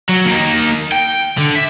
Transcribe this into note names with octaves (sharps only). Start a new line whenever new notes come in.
F#3
A#3 D#4
G5
D3
E5